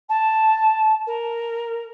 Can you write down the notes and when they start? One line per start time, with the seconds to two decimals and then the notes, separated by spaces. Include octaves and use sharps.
0.09 A5
1.06 A#4